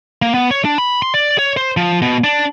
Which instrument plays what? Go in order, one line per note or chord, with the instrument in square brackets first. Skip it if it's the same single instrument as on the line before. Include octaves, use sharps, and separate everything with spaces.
[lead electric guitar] A#3
B3
C#5
D4
B5
C6
D5
C#5
C5
F3
B2
D4